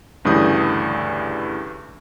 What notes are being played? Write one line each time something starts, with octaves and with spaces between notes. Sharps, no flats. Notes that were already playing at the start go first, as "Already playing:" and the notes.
D2 G2 C#3 E3 D#6 G6